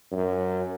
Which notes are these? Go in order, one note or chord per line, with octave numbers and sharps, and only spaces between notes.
F#2